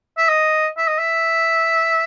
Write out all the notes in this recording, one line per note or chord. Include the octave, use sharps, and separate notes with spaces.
E5
D#5
E5
D#5
E5